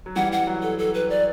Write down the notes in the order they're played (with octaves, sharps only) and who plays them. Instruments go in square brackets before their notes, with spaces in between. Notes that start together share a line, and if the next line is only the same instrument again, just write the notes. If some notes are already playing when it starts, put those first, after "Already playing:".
[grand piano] F#3
[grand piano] E3 G3 [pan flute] F#5
[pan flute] F#5
[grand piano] F#3
[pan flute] A4
A4
B4
D5